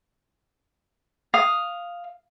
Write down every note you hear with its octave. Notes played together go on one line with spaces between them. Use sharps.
F5 D#6